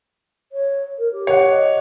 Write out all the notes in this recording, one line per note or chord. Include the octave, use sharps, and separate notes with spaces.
C#5
A#4
G4
C#5 F#5
D#5